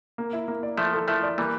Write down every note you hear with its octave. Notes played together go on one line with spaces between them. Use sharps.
A#3
E4
A#3
D5
F3 A3 E4
A4
F3 A3 E4
D5
E3 G3 A#3